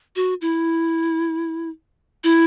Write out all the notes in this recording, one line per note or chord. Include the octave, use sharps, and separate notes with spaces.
F#4
E4
E4